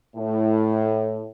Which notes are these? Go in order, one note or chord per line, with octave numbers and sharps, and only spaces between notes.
A2